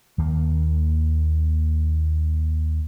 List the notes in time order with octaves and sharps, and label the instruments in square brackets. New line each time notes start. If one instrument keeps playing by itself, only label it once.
[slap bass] D#2 D#3 A#3